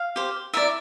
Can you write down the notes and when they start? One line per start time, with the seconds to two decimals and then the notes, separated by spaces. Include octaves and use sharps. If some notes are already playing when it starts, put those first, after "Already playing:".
Already playing: F5
0.16 G4 C5
0.53 E4 A#4 D5 E5